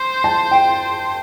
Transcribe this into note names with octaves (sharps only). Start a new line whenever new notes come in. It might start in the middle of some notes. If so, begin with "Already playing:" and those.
Already playing: C5
A5
G5